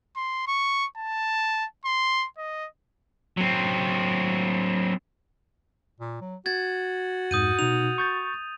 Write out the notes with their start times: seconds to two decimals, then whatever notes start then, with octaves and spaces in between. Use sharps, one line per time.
0.16 C6
0.48 C#6
0.97 A5
1.85 C6
2.38 D#5
3.37 F#3 C4
6.00 A#2
6.21 F#3
6.46 F#4 G#6 A6
7.31 F2 G#2 D#6 G6 D#7
7.59 B2 D#4 F7
7.98 C#6 G6 A6